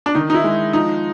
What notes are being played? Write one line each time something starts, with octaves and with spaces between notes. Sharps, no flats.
D4
D#3 D#4
D#4
E4
G#3
F3 D#4